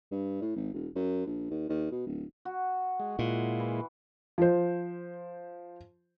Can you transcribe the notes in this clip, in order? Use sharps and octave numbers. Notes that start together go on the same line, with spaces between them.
G2
A2
G#1
E1
F#2
A#1
D#2
D#2
B2
D1
F#4
G#3
A#2 G#3 E4 F4
E3
F3 C5